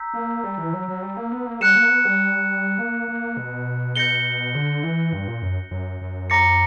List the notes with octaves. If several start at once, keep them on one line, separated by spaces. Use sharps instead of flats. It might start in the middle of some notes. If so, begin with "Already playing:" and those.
Already playing: A#5 E6 G6 B6
A#3
G3
E3
F#3
F#3
G3
A#3
B3
A#3
G3 F#6 C#7 E7
A#3
B3
G3
A#3
A#3
B2
G6 A#6 C#7 G7
D3
E3
G2
A#2
F#2
F#2
F#2
A#5 D6 A#6 C#7